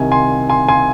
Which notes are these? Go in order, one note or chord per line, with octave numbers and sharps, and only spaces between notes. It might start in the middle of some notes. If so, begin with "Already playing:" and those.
Already playing: C2 C3 D#3 G#5
G#5 C6
G#5 C6
G#5 C6